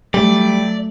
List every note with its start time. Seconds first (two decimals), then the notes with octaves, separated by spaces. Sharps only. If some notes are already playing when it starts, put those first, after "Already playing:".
0.14 F#3 G3 A3 D5